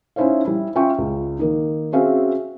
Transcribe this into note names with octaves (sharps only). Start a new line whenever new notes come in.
C#4 D#4 E4 C5 C#5 F5
G3 E4
C#4 F4 E5 G5 C#6
C#2
D#3 A#3 D#4
C4 C#4 F#4 G#4 E5 F5